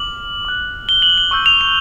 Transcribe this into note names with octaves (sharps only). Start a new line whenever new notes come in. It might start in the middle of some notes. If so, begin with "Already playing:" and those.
Already playing: D6 F6 F#7
D6 F#6
G7
F#7
G7
C#6 E6 G6 F#7
F7
F7